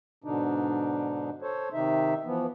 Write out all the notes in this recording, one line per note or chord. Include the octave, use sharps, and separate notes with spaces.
G#2 B2 D3 D4 D#4
A4 C5 C#5
C3 D#3 D#4 E5
E3 F3 B3